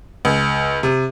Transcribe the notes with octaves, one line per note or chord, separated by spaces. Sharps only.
C#2
C3